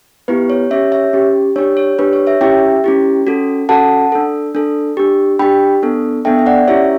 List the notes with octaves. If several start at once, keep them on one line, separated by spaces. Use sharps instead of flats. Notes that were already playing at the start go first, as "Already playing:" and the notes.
B3 E4 G4 B4
C#5
C#4 G4 C#5 E5
C#5 E5
C#4 G4
D4 G4 C#5
C#5
D4 G4 B4
C#5
C#5 E5
C#4 E4 G4 E5 G5
C#4 E4 G4
C#4 F#4 A4
C#4 F#4 A4 F#5 A5
D4 A4
D4 A4
D4 G4
D4 G4 G5 B5
B3 D4 A4
B3 D4 A4 E5 G5
E5
D5 F#5
C#4 E4 G4 C#5 E5